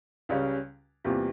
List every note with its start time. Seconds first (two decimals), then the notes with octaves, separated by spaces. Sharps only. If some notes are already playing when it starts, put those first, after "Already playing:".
0.29 C#2 C#3 G3 C#4
1.04 E2 C3 G3 A#3 F4